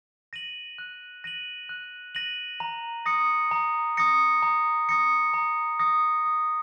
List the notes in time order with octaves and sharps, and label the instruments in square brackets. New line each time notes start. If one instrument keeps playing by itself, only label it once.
[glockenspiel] A#6 D#7 F#7
F#6
A#6 D#7 F#7
F#6
A#6 D#7 F#7
A#5
D#6 A#6 C#7
A#5
D#6 A#6 C#7
A#5
D#6 A#6 C#7
A#5
D#6 A#6 C#7
D#6